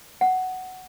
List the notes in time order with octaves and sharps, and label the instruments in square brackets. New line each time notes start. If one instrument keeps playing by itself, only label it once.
[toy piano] F#5